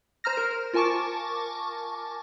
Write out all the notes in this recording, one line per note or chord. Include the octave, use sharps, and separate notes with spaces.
C5 A#5 F6 A#6
A#4
F4 A#4 G#5 A5 C#6 D6